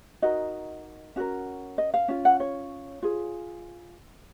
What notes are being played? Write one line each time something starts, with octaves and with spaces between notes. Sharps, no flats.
D#4 F#4 A#4 D#5
C#4 F#4 A#4
D#5
F5
C#4 F4
F#5
C#5
F4 G#4